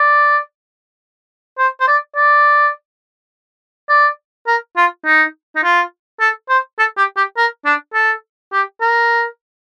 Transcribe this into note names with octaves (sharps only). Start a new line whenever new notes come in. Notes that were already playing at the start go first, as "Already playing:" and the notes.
Already playing: D5
C5
C5
D5
D5
D5
A#4
F4
D#4
D#4
F4
A4
C5
A4
G4
G4
A#4
D4
A4
G4
A#4